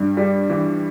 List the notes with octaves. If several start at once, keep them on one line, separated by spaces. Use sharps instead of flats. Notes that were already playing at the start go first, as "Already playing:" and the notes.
Already playing: G2 G3
G3
E3